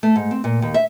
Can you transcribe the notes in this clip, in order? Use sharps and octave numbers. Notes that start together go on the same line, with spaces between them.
A3
G#2
C4
A#2
D#2
E5